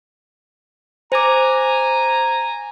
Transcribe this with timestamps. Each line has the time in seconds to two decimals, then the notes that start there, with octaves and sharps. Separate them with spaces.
1.12 C5 G#5 A#5 D6